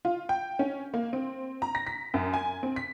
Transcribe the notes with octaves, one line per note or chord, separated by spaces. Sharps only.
F4
G5
C#4
A#3
C4
A#5
A#6
B6
F#2
G#5
C4
B6